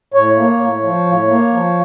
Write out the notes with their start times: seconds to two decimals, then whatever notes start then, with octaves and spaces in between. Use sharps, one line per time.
0.14 A2 C#5
0.36 A#3
0.60 A2
0.83 F3
1.06 A2
1.27 A#3
1.51 F3